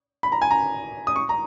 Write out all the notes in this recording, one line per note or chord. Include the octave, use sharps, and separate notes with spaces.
B5
A#5
G#5
A#5
D#6
C#6
A#5